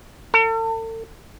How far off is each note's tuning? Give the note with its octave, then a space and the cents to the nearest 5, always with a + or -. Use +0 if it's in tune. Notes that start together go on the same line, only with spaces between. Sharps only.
A4 +40